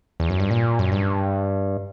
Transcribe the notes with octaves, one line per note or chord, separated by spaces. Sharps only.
E2
F#2
G2
A#2
F#2
G2